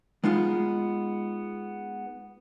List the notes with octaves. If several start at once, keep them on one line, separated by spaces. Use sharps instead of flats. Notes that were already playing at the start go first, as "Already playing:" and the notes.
G#3 B3 D#4 F4